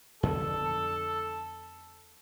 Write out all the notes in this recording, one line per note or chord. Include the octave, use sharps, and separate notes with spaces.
F2 D3 B3 A4